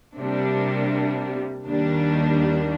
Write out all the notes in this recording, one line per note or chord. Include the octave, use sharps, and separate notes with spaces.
C3 G3 A#3 D4
D#2 D#3 G3 A#3 D4